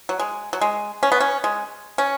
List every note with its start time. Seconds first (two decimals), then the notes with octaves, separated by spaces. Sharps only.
0.09 F#3
0.20 G#3
0.53 F#3
0.61 G#3
1.03 C#4
1.12 B3
1.20 C#4
1.44 G#3
1.98 C#4